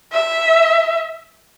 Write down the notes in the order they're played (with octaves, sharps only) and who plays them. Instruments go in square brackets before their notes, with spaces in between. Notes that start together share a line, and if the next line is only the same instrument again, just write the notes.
[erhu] E5